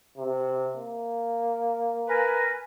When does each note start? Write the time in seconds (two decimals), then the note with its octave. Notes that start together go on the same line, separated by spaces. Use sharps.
0.18 C3
0.77 A#3
2.07 A#4 B4 G#5